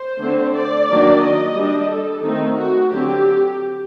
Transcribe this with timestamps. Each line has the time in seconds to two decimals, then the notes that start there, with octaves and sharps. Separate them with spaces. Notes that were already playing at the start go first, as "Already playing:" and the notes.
Already playing: C5
0.20 D3 A3 C4
0.54 D5
0.88 D#3 F#3 A#3 D4
1.21 D#5
1.55 G3 D4
1.88 A4
2.22 D#3 A3 C4 D#4
2.56 F#4
2.90 D3 F#3 C4 G4